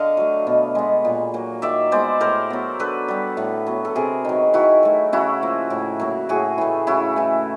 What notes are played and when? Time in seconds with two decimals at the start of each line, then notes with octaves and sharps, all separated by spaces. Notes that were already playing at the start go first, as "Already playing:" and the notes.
Already playing: D3 D#5 F5
0.17 F#3 A3
0.47 B2
0.75 G#3 B3
1.05 A#2
1.34 F#3 A#3
1.62 D#3 D5 E5
1.92 G#3 B3 C5 D5
2.20 A2 A#4 C5
2.50 F#3 B3
2.79 D3 A4 B4
3.08 G3 B3
3.37 A2
3.66 F#3 B3
3.85 A4
3.96 C3 G#4 A#4
4.25 D#3 F#3
4.54 D#3 E4 F#4
4.83 F#3 A3
5.13 C#3 E4 F#4
5.42 F3 A#3
5.70 A2
6.00 F#3 A#3
6.29 A2 F#4 G#4
6.58 E3 A3
6.87 C#3 E4 F#4
7.16 E3 A3